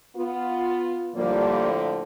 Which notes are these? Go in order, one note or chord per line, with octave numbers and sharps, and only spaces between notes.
B3 F4
A2 D3 F3 G3 A#3